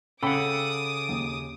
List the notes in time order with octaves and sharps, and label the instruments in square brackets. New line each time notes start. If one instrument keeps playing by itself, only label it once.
[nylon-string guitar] C#3 [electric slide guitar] A4 F#5 [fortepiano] G5 B5 [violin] D6 D#6
[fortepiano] D#2